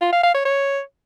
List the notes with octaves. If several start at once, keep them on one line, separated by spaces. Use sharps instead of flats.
F4
F5
F5
C#5
C#5